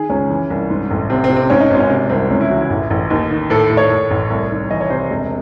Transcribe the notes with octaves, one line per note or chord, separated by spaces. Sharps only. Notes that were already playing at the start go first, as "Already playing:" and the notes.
Already playing: D#3 G#4
C#2 C#4
E3
C2
G#2
A1
C3 C4
C4
C3
C4
G#2 C#4
D#4
G#1
C#4
C3
C2 C4
C#2 C#4
E4
E3 F#4
E4
A1
A1
D#2 D#4
D#3
A2 A4
A2
C#5
A2
A1
C2
D#3
E3 D#5
C#5
C3 C5
E1